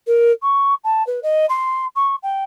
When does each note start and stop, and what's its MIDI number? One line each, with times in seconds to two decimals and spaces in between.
0.07 0.32 70
0.42 0.74 85
0.84 1.05 81
1.07 1.20 71
1.23 1.46 75
1.49 1.85 84
1.95 2.15 85
2.22 2.44 79